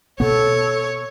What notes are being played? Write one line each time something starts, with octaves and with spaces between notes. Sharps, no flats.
B2 B3 A4 C#5